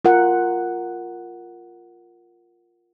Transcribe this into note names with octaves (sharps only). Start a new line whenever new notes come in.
F4 A#4 F#5